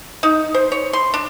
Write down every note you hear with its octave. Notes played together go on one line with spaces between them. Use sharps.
D#4
C5
C#5
C6
D4